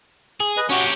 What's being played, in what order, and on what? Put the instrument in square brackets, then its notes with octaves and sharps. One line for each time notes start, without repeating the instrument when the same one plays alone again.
[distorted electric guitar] G#4
[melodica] B4 D#5
[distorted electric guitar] C#4 G4 [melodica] F#4